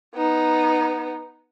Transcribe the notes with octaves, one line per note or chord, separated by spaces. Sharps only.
B3 D#4